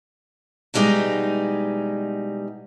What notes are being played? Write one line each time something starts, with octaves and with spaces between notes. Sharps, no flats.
B2 E3 G3 G#3 D#4